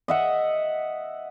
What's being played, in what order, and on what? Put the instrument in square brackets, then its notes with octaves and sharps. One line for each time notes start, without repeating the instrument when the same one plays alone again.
[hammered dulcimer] D#5 E5 F#5